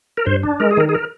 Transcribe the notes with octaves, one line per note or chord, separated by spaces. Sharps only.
A#4
G2 C5
D4
G#3 A#4
G#4
D#3 A#4
G#4
A#4